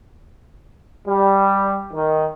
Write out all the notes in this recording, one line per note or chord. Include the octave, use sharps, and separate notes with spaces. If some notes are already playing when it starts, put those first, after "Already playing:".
G3
D#3